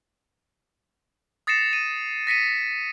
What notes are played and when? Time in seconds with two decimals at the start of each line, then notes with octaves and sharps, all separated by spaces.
1.47 D#6 A6 A#6 C7 C#7 E7
1.73 D#7
2.27 A#6 B6 C#7 D#7